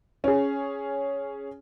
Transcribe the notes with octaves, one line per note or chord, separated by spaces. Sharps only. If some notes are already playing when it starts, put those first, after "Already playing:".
C#4 G#4